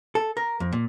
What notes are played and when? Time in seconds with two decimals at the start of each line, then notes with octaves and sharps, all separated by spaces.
0.15 A4
0.37 A#4
0.60 F2
0.73 A#2